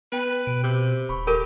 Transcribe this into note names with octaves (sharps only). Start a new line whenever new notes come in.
B3 B4 G5
B2 D7
C3
D#1 B5 C#6
G4 A4 A#4